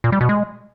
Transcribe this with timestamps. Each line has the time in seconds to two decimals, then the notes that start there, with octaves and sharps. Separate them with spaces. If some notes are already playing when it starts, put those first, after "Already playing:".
0.04 A#2
0.12 G3
0.21 B2
0.29 G#3